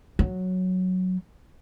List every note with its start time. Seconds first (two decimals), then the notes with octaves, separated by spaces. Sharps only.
0.19 F#3